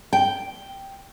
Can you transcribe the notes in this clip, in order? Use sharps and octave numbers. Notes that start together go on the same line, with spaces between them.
G5